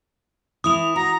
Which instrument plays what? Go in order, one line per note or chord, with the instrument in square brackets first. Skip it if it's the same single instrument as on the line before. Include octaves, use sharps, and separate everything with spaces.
[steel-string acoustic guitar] E3 E4 [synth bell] D#6 F7
[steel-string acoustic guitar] F#4 [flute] A#5